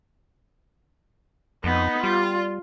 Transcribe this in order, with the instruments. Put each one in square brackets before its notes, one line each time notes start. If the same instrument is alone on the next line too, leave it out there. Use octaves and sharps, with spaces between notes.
[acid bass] F2 [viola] B3 D#4
[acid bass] G3 [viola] F4